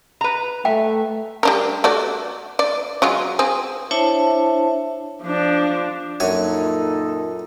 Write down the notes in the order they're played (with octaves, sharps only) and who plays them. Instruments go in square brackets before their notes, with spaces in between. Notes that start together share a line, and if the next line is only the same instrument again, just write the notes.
[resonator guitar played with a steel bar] B4 A#5
[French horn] A3 [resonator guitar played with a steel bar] E5 [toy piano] G5
[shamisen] G3 D4 A#4
A3 F#4 D5
D5
F#3 G#3 F4
C4 G#4
[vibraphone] D4 E4 C5 C#5 E5 A5
[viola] F3 D4
[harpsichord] F#2 C#5 G#5 [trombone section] A#2 D#4 A4